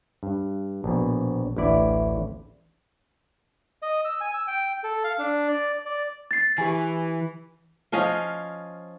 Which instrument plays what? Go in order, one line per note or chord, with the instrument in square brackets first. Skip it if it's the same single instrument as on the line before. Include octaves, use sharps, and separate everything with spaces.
[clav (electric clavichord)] G2
A#1 B2
A1 D2 E4 D5
[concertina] D#5
E6
G#5
E6
G5
A4
F5
D4
D5
D5
[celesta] A6 C7
[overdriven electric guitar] E3 [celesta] G4 G#5
[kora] F3 C#4 D#5 F5